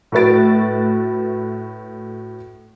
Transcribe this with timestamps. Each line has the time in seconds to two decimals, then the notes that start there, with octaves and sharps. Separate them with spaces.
0.12 A2 A3 F#4 B4 A6 D7